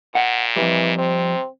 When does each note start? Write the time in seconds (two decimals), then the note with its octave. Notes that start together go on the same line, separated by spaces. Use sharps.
0.15 A#2 F#5
0.56 F2 E3 G3
0.98 C3 C4